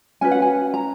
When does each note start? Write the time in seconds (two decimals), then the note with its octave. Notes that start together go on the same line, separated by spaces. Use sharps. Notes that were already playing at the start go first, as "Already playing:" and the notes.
0.21 C#4 F#4 B4 G#5
0.32 F#5
0.42 G#5
0.74 A#5